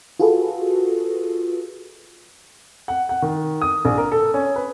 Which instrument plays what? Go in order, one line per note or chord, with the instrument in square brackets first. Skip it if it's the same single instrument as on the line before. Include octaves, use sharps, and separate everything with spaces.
[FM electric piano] F4 F#4 G#4 A4 B4
[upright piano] F#5
F#5
D#3
D#6
A#1
A#4
A4
C#4
B4